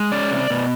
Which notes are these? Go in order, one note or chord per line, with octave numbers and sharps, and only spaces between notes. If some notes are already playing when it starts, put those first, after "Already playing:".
Already playing: G#3
C#4 D5
C3
B2